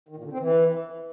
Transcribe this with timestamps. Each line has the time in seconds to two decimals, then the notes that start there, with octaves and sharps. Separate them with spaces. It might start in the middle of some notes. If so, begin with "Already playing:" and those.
0.09 D#3
0.16 A#2
0.24 D3
0.32 C4
0.40 E3